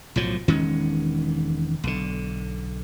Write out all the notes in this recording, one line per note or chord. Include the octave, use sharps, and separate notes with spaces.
B1 A2 F3 F#3
E1 D#3 G#3 C#4
B1 D3